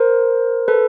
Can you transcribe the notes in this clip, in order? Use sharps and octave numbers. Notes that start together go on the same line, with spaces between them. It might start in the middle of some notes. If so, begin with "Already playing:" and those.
Already playing: A#4 C5
A4 B4